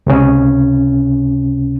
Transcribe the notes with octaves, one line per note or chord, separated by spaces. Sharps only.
C#2 C3 C#4